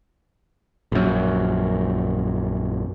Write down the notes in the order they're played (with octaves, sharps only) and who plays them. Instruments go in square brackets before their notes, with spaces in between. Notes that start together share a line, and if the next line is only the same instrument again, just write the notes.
[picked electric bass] A#1 F#2